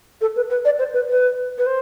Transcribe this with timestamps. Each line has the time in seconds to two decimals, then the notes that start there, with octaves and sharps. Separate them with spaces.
0.21 A4
0.36 B4
0.50 B4
0.65 D5
0.79 C5
0.94 B4
1.09 B4
1.58 B4
1.66 C5